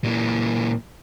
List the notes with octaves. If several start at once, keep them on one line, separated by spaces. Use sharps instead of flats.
A#2 E3